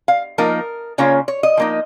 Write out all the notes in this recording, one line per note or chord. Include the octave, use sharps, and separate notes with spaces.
F5
F3 A#3 D#4 A#4
C#3 A#3 C#4 F4 C#5
C#5
D#5
F3 A#3 D#4